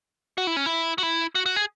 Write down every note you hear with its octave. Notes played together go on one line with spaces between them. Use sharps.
F#4
E4
C#4
E4
F#4
E4
F#4
F#4
G#4